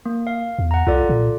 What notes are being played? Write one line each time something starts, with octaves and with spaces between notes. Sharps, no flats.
A#3
F5
E2
F#5 A#5
C2 F4 A4 D5
A#2